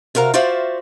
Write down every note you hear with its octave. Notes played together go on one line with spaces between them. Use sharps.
C3 F#4 A#4 F5 A#5
F4 F#4 C5 D5 E5 F5